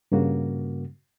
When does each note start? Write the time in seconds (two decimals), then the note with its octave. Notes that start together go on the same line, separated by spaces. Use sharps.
0.12 G2 C#3 A#3 F#4